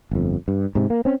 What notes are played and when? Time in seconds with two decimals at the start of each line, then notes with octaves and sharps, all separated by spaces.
0.11 G1 F2
0.48 G2
0.75 G#2 C3
0.90 A#3
1.05 C4 C#4